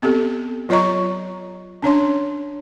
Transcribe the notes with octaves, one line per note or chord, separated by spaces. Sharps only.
B3 C4 G4 A4
F#3 F4 C#5 D#5 A#5 C#6
C#4 D4 C#5 C6